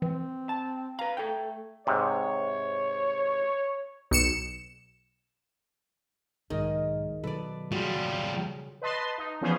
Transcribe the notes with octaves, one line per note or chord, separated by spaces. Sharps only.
E3 C4
A5
B4 F5 A#5
A3 A4 G5
G#2 C3 C#5
B1 C#7 E7
B1 G#2 D#3 G#4 A#4 D#5
B2 D#3 F#3 A4 B4 D5
C#3 G3 F4 F#4
B4 D#5 A5 C6
D#4
E3 F3 B3 C#4 G#4 C5